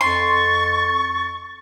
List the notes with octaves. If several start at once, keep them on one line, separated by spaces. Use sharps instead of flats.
F2 C6 C#6 A6